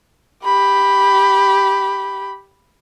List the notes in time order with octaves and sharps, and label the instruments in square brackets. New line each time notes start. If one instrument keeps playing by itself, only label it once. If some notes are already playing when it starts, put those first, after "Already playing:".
[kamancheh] G4 B5